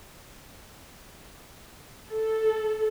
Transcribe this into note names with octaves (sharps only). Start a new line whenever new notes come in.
A4